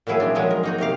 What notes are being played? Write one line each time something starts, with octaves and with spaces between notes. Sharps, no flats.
A#2 D#3 F#3 E4 G#4
C4 D4
D#3 F3 F#3 G#3
A#4
A#3 D#4 F#4
C3 D#3 G4 F5